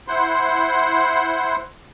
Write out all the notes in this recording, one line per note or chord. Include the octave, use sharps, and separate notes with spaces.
E4 C5 F#5 C6